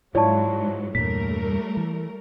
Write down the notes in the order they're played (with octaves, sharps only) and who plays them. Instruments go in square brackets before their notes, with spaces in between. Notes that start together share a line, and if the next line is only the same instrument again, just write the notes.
[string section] G#2 F#3 [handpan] E4 F4 C#5 [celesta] D5 A5
[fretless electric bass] E2 G2 A#2 [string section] G3 A3 A#4 [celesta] B6
[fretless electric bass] E3